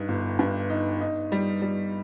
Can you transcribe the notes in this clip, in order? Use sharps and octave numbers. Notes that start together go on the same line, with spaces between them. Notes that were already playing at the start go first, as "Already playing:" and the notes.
Already playing: G2 D#4
G1
G2
D#4
D#4
G3
G3